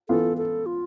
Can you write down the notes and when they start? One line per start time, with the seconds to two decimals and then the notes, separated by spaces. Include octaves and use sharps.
0.09 E3 B3 F4 A4
0.37 A4
0.66 F4